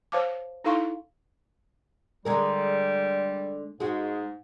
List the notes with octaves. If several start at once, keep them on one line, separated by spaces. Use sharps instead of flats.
C5 C#5 F5 A5 D6
D#4 E4 A4 F5 C6 C#6
D3 G3 G#3 A#4
G#2 G#3 F#4